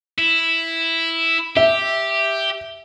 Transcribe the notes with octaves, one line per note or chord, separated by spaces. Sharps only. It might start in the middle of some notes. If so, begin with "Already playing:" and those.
E4
G4 E5